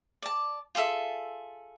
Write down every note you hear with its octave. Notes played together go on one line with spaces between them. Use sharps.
D5 A5
F4 G#4 A4 E5